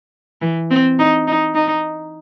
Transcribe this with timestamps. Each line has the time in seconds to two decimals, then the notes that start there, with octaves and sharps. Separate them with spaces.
0.42 E3
0.71 C4
0.99 D#4
1.27 D#4
1.55 D#4